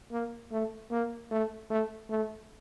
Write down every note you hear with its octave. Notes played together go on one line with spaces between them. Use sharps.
A#3
A3
A#3
A3
A3
A3